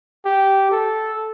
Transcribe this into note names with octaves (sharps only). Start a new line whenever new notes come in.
G4
A4